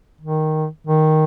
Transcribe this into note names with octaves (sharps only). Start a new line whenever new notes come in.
D#3
D#3